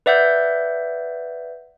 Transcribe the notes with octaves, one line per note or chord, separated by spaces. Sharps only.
B4 D5 E5 F#5 G6